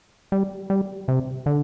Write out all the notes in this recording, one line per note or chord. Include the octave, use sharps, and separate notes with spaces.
G3
G3
C3
D3